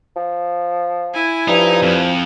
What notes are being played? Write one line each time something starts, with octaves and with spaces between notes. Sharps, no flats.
F3
E4 G#5
G2 F3 D#4
F2